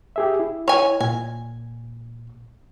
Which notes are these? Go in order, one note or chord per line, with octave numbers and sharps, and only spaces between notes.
G4 G#4 E5
E4
C#5 G#5
A#2 G#5